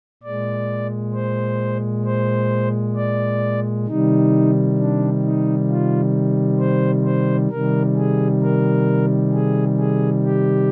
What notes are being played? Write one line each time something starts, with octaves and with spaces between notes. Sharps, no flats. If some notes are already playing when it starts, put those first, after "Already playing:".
A#2 G#3 D5
C5
C5
D5
C3 D#3 G3 D#4
D4
D#4
F4
C5
C5
C3 D#3 G3 A#4
G#4
A#4
G#4
G#4
G4